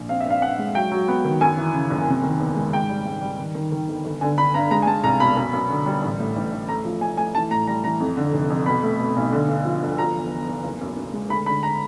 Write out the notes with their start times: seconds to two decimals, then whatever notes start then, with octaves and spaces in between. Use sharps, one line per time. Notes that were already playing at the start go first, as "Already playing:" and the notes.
Already playing: A#1
0.09 C4 F5
0.20 E5
0.26 G2 F5
0.42 G2 F#5
0.59 G#3
0.75 F#3 G5
0.92 F#3
1.08 B3
1.24 D#3
1.41 F#2 G#5
1.57 E3
1.74 C#3
1.90 F#1
2.07 C3
2.24 D#3
2.40 E2
2.56 G#3
2.73 G#2 G5
2.89 G3
3.06 G#2
3.22 G3
3.39 D#3
3.55 D#3
3.72 D#3
3.88 G1
4.05 G1
4.21 D3 G#5
4.38 D3 B5
4.54 G2 A#5
4.71 G#3 A#5
4.82 G#5
4.87 G#3 A5
5.04 C2 A#5
5.20 B2 B5
5.37 F#2
5.53 F#2
5.70 D3
5.86 G3
6.03 A1
6.19 A2
6.36 A1
6.52 A1
6.69 A3 A#5
6.85 F3
7.01 A3 G#5
7.17 A3 G#5
7.34 E3 A5
7.50 A2 A#5
7.67 G3 A#5
7.84 E3 A#5
8.00 F2
8.17 D3
8.33 F1
8.50 F2
8.66 B2 B5
8.83 A3
9.00 B2
9.16 B1
9.32 D3
9.49 G2
9.65 F3
9.82 G1
9.98 F3 A#5
10.14 E2
10.31 E2
10.48 E2
10.64 F#1
10.81 F#2
10.97 F#2
11.13 G#3
11.30 D2 B5
11.46 D3 B5
11.63 A#5